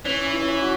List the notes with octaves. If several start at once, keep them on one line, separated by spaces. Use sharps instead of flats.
E3 C#4
E4
C#4
E4
F#4